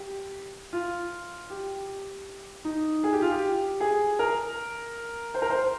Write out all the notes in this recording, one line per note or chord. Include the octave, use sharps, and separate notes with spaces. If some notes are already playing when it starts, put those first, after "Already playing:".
Already playing: G4
F4
G4
D#4
G#4
G4
F4
G4
G#4
A#4
C5
A#4
C5